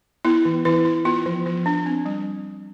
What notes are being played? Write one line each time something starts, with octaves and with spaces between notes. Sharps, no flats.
B3 E4
E3
E3 E4
E4
B3 F4
F3
F3
D4
C4
G3